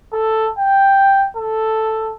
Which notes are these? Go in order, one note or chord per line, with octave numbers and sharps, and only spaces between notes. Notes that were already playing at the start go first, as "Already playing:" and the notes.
A4
G5
A4